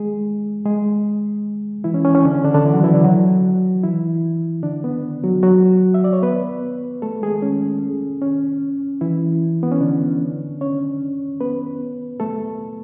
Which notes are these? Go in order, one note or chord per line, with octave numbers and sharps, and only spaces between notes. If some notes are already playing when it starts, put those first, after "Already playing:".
Already playing: G#3 G#4
G#3 G#4
E3 E4
C#4
C#4
C#4
D3 D4
C#4
D3 D4
D3 D4
E3 E4
F#3 F#4
E3 E4
D3 D4
F#3 F#4
E3 E4
D3 D4
B3
F#3 F#4
F#3 F#4
E5
D5
C#5
B3 B4
A3 A4
G#3 G#4
C#4
C#4
E3 E4
B3
C#4
D3 D4
C#4 C#5
B3 B4
A3 A4